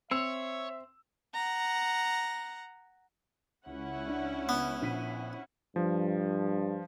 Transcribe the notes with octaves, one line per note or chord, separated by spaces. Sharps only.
C4 C#5 E5 E6
F#5 A#5
C#2 C#4 E4 F#5
D4
B3
A#1 B6 D#7
G2 F3